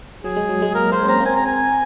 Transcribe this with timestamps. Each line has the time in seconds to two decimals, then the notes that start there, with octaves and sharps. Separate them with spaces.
0.24 F#3 G#4
0.37 G#3
0.49 F#3
0.62 G#3
0.75 A#3 A#4
0.92 A#3 C5
1.03 C#4
1.08 C4 A#5
1.20 A#3
1.25 C4 G#5
1.36 A#5
1.46 G#5